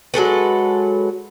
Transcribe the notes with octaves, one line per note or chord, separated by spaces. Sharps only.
F#3 G#3 A4 B4